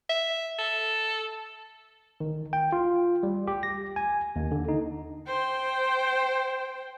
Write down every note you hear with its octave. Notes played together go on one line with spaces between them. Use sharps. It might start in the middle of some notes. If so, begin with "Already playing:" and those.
E5
A4
D#3
G5
F4
G3
G4
A#6
G#5
D#2
D3
D#4
C5 G5